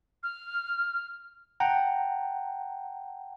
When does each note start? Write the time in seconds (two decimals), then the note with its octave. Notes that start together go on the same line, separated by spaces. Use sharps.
0.23 F6
1.60 F#5 G5 A5 A#5